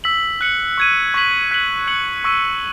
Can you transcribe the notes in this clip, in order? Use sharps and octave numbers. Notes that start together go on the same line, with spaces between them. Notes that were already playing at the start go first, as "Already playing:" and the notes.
E6 B6 F#7
F#6 C#7 F#7
C#6 G#6 D#7
C#6 G#6 B6 F#7
F#6 B6 D#7 F#7
F#6 C#7 F#7
C#6 E6 B6 D#7